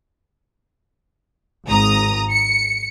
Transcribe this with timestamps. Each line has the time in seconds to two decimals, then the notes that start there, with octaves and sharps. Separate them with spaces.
1.67 G#1 A#5 D#6
2.31 C#7